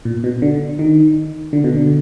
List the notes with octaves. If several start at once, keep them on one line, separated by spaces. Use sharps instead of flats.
A#2
B2
D3
D#3
D3
B2
D3